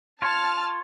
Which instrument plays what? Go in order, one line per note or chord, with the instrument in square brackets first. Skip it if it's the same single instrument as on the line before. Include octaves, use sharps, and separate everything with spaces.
[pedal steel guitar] F4 C#5 [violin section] A5 F6